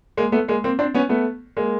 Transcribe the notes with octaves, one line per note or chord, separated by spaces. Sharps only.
G#3 A#3
A3 B3
G#3 A#3
A#3 C4
C4 D4
B3 C#4
A3 B3
G#3 A#3